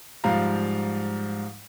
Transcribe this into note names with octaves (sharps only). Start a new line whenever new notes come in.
G#2 F3 G3 F5 A#5